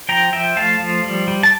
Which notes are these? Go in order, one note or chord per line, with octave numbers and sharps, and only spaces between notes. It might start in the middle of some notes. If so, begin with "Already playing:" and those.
F3 G5 A#5
F3 E5 G5
A3 F5 A5
F3
G3
G3
A5